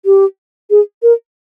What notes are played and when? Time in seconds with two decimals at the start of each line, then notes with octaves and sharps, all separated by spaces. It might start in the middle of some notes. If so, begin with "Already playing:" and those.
0.05 G4
0.70 G#4
1.02 A#4